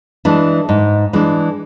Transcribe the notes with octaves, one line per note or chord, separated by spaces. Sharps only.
E3 G#3 D4
G#2
E3 G#3 D4